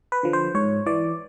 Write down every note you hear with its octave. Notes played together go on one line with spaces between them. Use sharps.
B4
D3 F3
C5
G#2 C#5
E3 D5